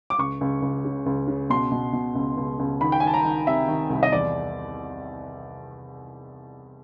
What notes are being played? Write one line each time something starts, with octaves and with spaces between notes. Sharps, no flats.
D6
C#2 C#6
C#2
C#2
C#3
C#2
C#3
B2 C6
B2
B2
C#2
C#2
C#2
D#3 B5
G5
G#5
D#3 A5
A#5
D#3
C3 E5
D#3
C2
D#5
E2 D5